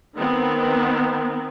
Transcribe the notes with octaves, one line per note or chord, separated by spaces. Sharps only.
D#3 B3 C4